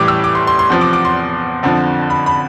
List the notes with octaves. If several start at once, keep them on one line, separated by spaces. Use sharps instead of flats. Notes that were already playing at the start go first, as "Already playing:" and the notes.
Already playing: A2 E3 G3 D6
E6
D6
C6
C6
C6
E2 C3 F3
D6
D6
C6
F2 D3 F3
B5
B5